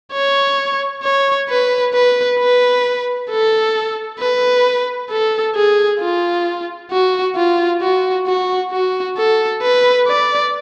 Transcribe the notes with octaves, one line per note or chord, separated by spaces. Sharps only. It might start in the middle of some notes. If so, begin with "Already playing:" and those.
C#5
C#5
B4
B4
B4
A4
B4
A4
G#4
F4
F#4
F4
F#4
F#4
F#4
A4
B4
D5